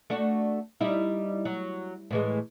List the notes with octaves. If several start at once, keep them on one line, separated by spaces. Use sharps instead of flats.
A3 D4 F#4
G3 D#4 E4
F#3
A2 E3 G#3